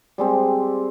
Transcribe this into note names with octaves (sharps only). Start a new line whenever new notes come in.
G3 G#3 C4